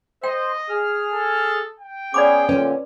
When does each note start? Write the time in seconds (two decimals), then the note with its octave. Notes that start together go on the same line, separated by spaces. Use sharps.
0.23 C5 D#5 G5
0.70 G#4 F6
1.13 A4
1.80 G5
2.14 B3 C#4 G#4 D5 B5 D6
2.49 A#2 D3 C#4 B4